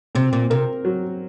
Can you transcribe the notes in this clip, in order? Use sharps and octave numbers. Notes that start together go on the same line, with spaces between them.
C3 C4
A#2
C3 A#4
F#3